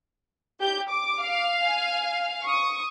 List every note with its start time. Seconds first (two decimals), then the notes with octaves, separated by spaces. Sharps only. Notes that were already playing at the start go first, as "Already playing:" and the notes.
0.60 G4 G6
0.89 D6
1.21 F5
1.63 G#5
2.44 C#6 D#6